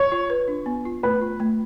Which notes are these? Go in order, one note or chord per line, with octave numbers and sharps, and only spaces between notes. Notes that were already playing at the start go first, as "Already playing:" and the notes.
Already playing: C#5
F4
B4
D4
B3
F4
A3 B4
F4
A3